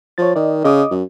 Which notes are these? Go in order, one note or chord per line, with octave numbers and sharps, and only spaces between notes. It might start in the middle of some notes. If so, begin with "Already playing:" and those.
F3 C#5 A6
D#3 D5 D#5
C#3 D#5 D6 D#6
F#2